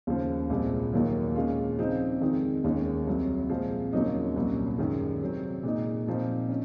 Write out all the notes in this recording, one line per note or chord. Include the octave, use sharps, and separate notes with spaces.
D#2 C#3 F3
C2 A#2 F3 G#3
D#2 D#3 F#3 A#3
A#2 G#3 C#4 F4
C#3 F3 C4 D#4
F2 D#3 G#3 D#4
D#2 D#3 G#3 C#4
C2 C3 F#3
A#2 F3 G#3 C4
D#2 C#3 F#3 A#3 D#4
C2 A#2 F#3 C#4
F#2 D#3 G#3
C3 F#3 C4
A#2 G#3 D#4
A#2 F3 C4 D#4
C#4